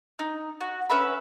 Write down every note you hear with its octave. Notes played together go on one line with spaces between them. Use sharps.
D#4
F#4
C#4 B4 E5 B5